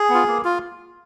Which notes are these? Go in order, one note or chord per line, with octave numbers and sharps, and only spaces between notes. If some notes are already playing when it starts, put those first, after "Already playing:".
Already playing: G#4
B3
F4
A#3
F4